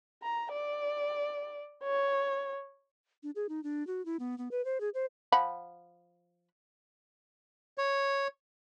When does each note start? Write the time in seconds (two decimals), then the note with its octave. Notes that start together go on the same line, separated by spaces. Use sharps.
0.23 A#5
0.53 D5
1.84 C#5
3.23 D4
3.36 G#4
3.49 D#4
3.63 D4
3.87 F#4
4.06 E4
4.20 B3
4.38 B3
4.51 B4
4.65 C5
4.80 G#4
4.94 C5
5.32 F3 F#5 B5
7.78 C#5